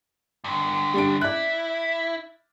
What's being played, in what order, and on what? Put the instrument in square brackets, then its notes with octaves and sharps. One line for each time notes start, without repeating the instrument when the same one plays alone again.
[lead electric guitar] G2 D3
[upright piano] G3 D4 D7
[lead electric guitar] E4 [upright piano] D5 F#6